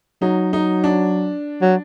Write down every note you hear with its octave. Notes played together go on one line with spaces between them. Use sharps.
F#3 D#4
D#4
D4
F#3